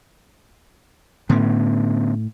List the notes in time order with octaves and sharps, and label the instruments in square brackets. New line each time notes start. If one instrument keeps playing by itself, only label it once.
[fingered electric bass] A2 [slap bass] D3 B3 C#4